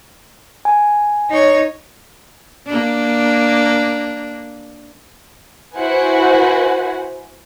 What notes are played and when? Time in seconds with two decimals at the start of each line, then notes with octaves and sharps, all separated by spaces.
0.65 G#5
1.30 D#4 C#5
2.66 A#3 D4
5.76 E4 F#4 B4 C5 F#5 G#5